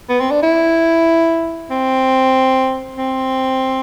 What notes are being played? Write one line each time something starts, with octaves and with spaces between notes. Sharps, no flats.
B3
C4
D4
E4
C4
C4